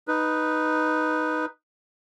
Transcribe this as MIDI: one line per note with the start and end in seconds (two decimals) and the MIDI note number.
0.08 1.46 63
0.08 1.46 71